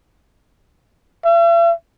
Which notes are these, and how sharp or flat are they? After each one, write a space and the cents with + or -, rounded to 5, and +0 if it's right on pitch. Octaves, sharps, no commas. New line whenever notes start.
E5 +45